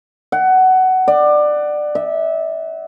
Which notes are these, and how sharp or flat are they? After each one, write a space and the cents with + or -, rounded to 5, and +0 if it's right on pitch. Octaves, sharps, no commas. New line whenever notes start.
F#5 +15
D5 +20
E5 -25